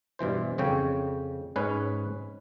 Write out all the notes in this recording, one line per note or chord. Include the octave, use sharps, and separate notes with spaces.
G2 B2 E3 C5
F2 C#3 C#5 G5
G#2 C#4 B4 C#5